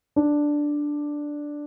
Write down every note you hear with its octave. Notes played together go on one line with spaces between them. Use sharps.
D4